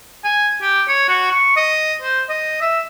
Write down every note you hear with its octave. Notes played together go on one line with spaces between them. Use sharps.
G#5
G4
C#5
F#4
C#6
D#5
C5
D#5
E5